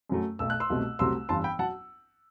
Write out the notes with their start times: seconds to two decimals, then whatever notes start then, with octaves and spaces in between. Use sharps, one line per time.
0.10 F#2 F#3 A3
0.39 B1 B2 A3 E6
0.50 F#6
0.60 C6 E6
0.70 C2 B2 F#3 A3
0.99 C2 C3 F#3 A3 C6 E6
1.29 G1 G2 E3 A5 C6
1.44 G5 B5
1.59 F#3 F#5 A5